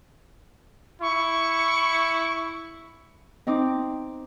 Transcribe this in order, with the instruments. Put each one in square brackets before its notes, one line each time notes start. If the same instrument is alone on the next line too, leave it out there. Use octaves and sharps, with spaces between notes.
[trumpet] E4 [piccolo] C#6
[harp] C4 D#4 D6